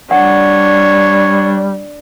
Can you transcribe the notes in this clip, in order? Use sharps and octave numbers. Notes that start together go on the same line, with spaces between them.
G3 D4 C#5 F#5